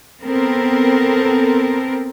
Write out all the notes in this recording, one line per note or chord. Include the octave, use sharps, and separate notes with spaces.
B3 C4 A4 A#4